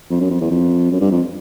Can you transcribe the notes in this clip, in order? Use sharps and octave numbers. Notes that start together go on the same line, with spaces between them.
F2
F#2
F2
E2
F2
F#2
G2
F2